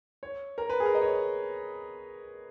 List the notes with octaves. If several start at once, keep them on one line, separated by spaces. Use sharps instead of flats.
C#5
A#4
B4
G#4
A#4
D#5
C#5